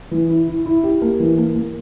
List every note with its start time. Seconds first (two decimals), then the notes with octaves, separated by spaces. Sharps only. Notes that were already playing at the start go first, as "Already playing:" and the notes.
0.11 E3
0.29 E4
0.48 E4
0.66 E4
0.83 G4
1.02 A#3
1.20 E3
1.38 A#3
1.55 A#3